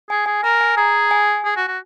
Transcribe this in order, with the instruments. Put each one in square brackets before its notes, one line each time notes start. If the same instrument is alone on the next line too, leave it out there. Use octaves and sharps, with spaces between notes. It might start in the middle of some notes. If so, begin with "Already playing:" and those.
[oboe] G#4 [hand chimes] G#5
[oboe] G#4 [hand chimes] G#5
[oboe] A#4 [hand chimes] A#5
[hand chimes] G#5
[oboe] G#4 [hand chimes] A#5
[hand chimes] G#5
[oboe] G#4
F#4
F#4